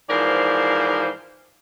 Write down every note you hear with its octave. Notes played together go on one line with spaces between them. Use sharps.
G#2 E3 F3 A#4 C5 D5